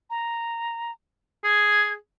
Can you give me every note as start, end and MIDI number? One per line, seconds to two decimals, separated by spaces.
0.10 0.92 82
1.44 1.94 68
1.44 1.92 92